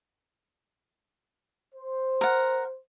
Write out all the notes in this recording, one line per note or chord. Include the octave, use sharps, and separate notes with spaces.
C5
A#4 F#5